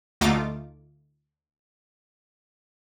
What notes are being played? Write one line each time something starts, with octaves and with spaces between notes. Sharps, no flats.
D2 A3 D#4 F4 D6 A6